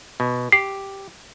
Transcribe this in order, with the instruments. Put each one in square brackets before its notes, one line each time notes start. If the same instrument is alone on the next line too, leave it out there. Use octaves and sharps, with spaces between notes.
[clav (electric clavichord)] B2
[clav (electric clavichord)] G4 [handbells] C7